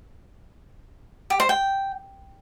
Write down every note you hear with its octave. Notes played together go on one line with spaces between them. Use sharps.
G4
C5
G5